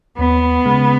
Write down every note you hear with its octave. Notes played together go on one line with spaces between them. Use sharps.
D#2 B3
C#3 G#3